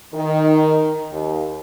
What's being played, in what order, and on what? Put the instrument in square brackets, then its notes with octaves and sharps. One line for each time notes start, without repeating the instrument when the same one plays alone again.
[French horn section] D#3
D#2